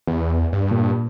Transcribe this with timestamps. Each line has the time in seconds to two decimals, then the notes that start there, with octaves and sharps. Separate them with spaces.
0.07 E2
0.53 G2
0.71 A#2